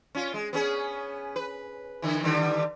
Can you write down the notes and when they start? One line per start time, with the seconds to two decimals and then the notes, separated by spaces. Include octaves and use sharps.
0.15 C#4 F4
0.34 G#3
0.53 B3 C#4 G#4
1.36 B4
2.02 D3 E3
2.23 D3 D#3 G3